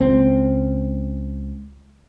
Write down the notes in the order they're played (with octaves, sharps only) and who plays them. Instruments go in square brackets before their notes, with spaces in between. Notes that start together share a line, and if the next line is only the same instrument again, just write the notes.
[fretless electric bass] C#2 C4